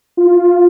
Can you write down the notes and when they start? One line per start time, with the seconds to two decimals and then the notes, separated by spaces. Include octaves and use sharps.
0.17 F4